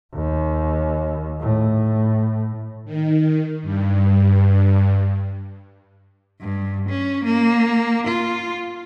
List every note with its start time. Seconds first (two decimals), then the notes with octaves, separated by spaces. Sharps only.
0.15 D#2
1.41 A2
2.85 D#3
3.63 G2
6.41 G2
6.89 C#4
7.25 A#3
8.07 F4